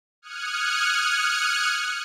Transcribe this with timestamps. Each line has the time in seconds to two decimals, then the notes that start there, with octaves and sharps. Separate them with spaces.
0.22 D#6 F6 F#6 G#6 C#7